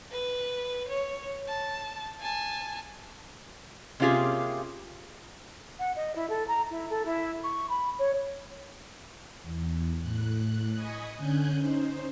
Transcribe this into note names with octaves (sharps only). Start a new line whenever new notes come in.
B4
C#5
A5
G#5 A5
C3 A#3 C#4 F4 G4 G#4
F#5
D#5
E4
A4
A#5
E4
A4
E4
C#6
B5
C#5
E2
A2 F#6
D#5 G#5 B5 C#6 D#6
D3 C#4 G#5 F#6 G6
C#4 D#4 C5